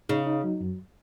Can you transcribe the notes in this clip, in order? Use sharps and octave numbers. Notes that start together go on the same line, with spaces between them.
C#3 D#4
D#4
F#3
F#2